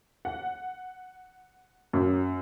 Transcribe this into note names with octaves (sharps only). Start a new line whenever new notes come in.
F#5
F#2